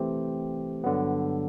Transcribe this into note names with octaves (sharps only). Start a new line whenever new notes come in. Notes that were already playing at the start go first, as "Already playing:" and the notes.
Already playing: E3 A3 C4 G4
G2 D3 F#3 B3